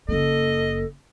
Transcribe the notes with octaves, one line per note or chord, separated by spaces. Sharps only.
F#1 A#3 A4 D#5